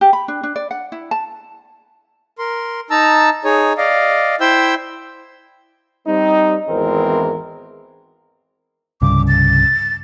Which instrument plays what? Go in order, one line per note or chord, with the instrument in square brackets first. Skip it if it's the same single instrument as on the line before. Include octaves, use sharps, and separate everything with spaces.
[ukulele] G4
B5
D4
D4
D5
F#5
E4
A5
[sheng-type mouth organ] A#4 C6
D#4 A5 A#5 E6
D#4 G#4 C#5
D5 D#5 F5
E4 C5 E5 G5 E6 G6
[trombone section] G3 C4 D#4
G#1 E2 E3 G#3 C4 A#4
[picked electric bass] C2 G2 C#3 [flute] D6
[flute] A6